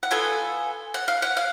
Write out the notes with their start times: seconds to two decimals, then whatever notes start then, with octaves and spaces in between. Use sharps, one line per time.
0.03 F#5
0.11 B3 F4 A4 G#5
0.94 F#5
1.08 F5
1.22 F#5
1.37 F5